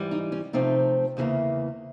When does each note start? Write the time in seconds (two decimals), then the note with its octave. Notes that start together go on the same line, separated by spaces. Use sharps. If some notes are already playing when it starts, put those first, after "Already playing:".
Already playing: G#2 E3 G3
0.11 D#4
0.32 C#4
0.53 C3 F3 A3 C4 D#4
1.17 E2 C#3 E3 G3 A#3